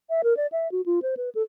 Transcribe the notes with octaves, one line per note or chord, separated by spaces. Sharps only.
E5
A#4
D5
E5
F#4
F4
C5
B4
A4